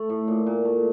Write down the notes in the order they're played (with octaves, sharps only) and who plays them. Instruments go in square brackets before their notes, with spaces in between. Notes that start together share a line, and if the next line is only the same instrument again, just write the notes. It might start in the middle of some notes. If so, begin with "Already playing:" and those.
Already playing: [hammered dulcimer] A3
A2
A#2
A#2
A3